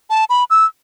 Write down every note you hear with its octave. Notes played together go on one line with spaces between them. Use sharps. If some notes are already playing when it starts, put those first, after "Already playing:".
A5
B5
E6